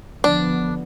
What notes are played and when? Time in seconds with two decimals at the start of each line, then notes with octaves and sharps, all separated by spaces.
0.24 D3 F3 B3 D4